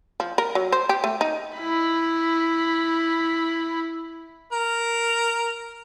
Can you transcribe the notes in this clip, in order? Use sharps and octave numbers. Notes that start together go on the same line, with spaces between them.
F3
A#4
F#3
C5
G4
A3
D#4
E4 B5
A#4